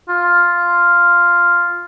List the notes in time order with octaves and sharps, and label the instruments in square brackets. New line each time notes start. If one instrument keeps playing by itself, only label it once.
[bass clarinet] F4